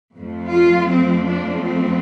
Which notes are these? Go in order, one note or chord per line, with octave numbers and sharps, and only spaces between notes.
F2 F3 A3
F4
C4
D4
C4